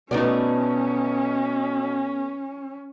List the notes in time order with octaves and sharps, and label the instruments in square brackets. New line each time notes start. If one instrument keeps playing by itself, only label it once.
[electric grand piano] B2 D#4 [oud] A3 B3 D5 [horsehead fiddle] C#4